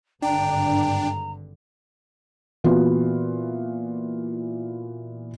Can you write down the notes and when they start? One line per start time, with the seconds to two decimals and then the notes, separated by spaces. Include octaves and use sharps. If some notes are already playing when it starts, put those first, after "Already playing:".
0.22 G#1 G2 D3 D4 G5 A#5
2.64 A#2 E3 B3 F4 F#4